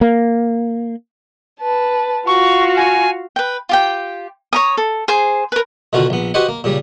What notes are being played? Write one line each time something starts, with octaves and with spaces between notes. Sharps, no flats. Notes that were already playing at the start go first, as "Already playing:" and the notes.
A#3
B4 A5
F4 F#4 F5 C#6
G#5
B4 G5
F4 G4 G5
C#5 A#5 D#6
A4
G#4 C5
A#4 B4
B2 D3 D#3 F4 F#4
A#1 B3
F#4 G4 B4 C5 D#5 F#5
A#3
A#2 C#3 G3